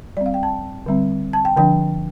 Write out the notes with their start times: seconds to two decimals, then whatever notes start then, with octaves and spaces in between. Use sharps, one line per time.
0.17 G3 C4 D5
0.26 F5
0.34 G5
0.43 A5
0.86 D3 G3 C4
1.33 A5
1.45 G5
1.56 D3 F3 D4 G5